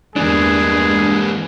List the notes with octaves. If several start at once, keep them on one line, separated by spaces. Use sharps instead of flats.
E2 G2 E3 G#3 A#3 D4 G#4